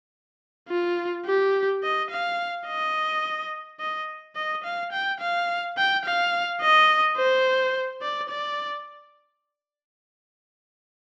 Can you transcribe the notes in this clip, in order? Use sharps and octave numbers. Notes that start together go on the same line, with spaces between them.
F4
G4
D#5
F5
D#5
D#5
D#5
F5
G5
F5
G5
F5
D#5
C5
D5
D5